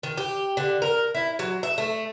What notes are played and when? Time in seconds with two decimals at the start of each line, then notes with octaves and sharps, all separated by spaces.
0.03 D#3
0.17 G4
0.57 D3
0.82 A#4
1.15 E4
1.39 F#3
1.63 E5
1.78 A3